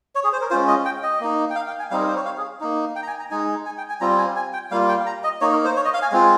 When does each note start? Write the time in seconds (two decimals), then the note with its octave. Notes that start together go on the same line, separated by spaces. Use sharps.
0.15 C#5
0.24 G#4
0.33 C5
0.41 A#4
0.50 G#3 C#4 F4 C5
0.68 D#5
0.85 G5
1.03 D#5
1.20 A#3 D#4
1.50 G5
1.56 F5
1.67 G5
1.79 G#5
1.91 G3 C4 D#4 F5
1.99 A#4
2.08 C5
2.16 C#5
2.25 F5
2.37 G#4
2.60 A#3 D#4
2.96 G5
3.02 A#5
3.07 G#5
3.19 A#5
3.31 G#3 D#4 G#5
3.66 G#5
3.78 G5
3.89 G#5
4.01 G3 C4 F4 A#5
4.18 G#5
4.36 G#5
4.53 G5
4.71 G3 A#3 F4 F5
4.88 G5
5.06 A#5
5.24 D#5
5.41 A#3 D#4 C#5
5.53 A#4
5.65 C5
5.76 C#5
5.85 D#5
5.94 F5
6.02 G#5
6.12 G#3 C4 F4